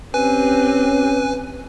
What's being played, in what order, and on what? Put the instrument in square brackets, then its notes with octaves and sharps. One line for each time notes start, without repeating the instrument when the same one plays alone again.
[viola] C4 G4 [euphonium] C#4 [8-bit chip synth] B4 G#5